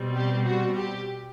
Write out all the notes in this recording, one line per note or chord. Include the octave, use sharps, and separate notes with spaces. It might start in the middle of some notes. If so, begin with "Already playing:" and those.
Already playing: B2 G3 C4
G4
F#4
G4